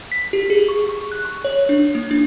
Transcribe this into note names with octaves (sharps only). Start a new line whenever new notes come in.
B6
G4
G#4
C#6
C#6
F#6
C#6
C#5
D4
A#3
D4